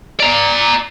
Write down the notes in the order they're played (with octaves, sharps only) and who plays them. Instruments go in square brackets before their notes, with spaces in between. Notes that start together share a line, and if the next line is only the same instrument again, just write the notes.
[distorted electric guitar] D5 A#5